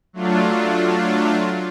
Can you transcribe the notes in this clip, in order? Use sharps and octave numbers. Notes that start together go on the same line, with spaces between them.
F#3 A3 D4 F4